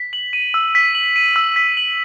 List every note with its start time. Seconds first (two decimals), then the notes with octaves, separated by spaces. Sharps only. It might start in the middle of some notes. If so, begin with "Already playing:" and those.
Already playing: B6
0.13 F#7
0.33 D#7
0.54 E6
0.75 B6
0.95 F#7
1.16 D#7
1.36 E6
1.56 B6
1.77 F#7